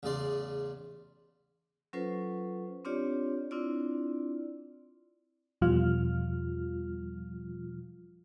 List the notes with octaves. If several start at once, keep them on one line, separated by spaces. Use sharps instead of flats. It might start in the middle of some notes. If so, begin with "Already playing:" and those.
A1 E2 C#3 G#4 D5 C6
F#3 C#4 F4 A4 B4 C5
C4 D4 F4 G4 C#5 D5
C4 D4 E4 F4 D5
E2 B2 F3 G3 F4 F6